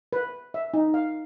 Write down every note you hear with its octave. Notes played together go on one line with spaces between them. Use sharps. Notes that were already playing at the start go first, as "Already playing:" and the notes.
B4
E5
D#4
F5